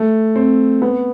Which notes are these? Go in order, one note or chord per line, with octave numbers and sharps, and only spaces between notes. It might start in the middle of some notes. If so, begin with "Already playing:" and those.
Already playing: A3
C4
B3